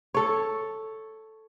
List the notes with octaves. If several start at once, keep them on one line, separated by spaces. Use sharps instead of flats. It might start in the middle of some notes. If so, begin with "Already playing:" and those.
A4 C#5